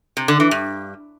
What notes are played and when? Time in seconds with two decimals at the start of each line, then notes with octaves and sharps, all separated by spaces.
0.17 C3
0.28 D3
0.40 E3
0.51 G2